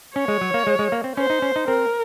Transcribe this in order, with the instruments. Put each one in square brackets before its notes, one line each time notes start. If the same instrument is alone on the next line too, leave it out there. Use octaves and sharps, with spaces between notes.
[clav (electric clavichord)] C#4 [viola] C#5
[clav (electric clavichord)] G#3
F#3
A#3
G#3
G#3
A#3
C4
[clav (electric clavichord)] C#4 [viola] C5
[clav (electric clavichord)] D#4
C#4
D#4
[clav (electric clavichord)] C4 [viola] A#4